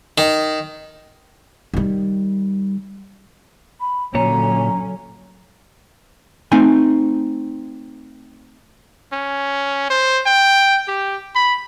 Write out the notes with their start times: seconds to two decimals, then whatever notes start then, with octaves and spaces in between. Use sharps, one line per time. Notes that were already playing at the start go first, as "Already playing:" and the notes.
0.18 D#3
1.74 D#3 G3
3.80 B5
4.15 A#2 D3 F#3 C#4 C#5 A#5
6.52 A3 C4 D#4 G#5
9.13 C#4
9.90 C5
10.26 G5
10.88 G4
11.35 B5